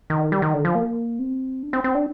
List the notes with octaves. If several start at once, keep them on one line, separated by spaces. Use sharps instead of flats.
D#3
G3
D#3
D3
F3
A#3
C4
D4
C4
C4
D4